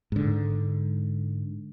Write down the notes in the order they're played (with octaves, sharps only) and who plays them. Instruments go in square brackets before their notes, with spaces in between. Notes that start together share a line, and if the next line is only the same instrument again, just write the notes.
[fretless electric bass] G#2 D3